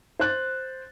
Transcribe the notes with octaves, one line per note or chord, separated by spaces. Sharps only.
C5 F#6 A6